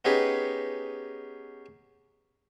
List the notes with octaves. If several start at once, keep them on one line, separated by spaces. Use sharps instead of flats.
B3 C#4 D#4 G4 G#4 B4